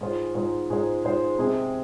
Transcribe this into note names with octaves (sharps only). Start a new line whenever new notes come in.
G#2 G#3 F4 C5
G#2 G#3 F4 C5
G#2 G#3 F4 C5
G#2 G#3 F4 C5
C3 G#3 C4 G#4